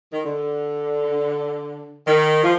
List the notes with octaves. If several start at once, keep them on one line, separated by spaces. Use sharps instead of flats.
D#3
D3
D#3
F3